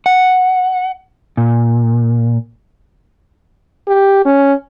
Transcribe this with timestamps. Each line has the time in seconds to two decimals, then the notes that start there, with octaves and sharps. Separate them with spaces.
0.06 F#5
1.37 A#2
3.88 G4
4.25 C#4